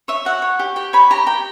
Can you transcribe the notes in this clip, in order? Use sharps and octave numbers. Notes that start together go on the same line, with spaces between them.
C#5 E5
F#4 F#5
C#5
G4
G4 G5
C#5 B5
G4 A#5
G4 G5